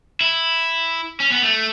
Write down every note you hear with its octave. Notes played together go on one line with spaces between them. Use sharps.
E4
C#4
B3
A3